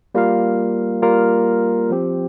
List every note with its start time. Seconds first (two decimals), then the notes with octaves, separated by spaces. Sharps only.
0.15 G3 A#3 F4 A#4 F5
1.02 G3 A#3 F4 A#4 F5
1.90 F3 C4 G4